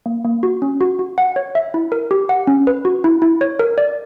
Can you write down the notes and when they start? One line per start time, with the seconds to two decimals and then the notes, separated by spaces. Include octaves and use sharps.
0.06 A#3
0.25 A#3
0.43 F#4
0.62 C#4
0.81 F#4
0.99 F#4
1.18 F#5
1.36 C#5
1.55 E5
1.74 E4
1.92 A#4
2.11 G4
2.29 F#5
2.47 C#4
2.67 B4
2.85 F#4
3.04 E4
3.22 E4
3.41 C#5
3.59 A#4
3.78 D5